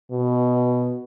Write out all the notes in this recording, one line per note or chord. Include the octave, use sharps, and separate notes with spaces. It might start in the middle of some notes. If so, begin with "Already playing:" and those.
B2